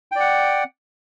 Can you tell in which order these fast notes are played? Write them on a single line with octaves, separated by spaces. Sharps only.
G5 D5 F#5